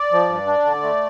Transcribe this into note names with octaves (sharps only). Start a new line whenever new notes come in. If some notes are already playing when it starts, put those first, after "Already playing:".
Already playing: D5
F3
G2
D4
D3
A3